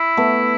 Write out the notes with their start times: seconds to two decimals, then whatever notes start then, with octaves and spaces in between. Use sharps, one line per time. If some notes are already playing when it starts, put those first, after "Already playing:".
Already playing: E4
0.17 A3 B3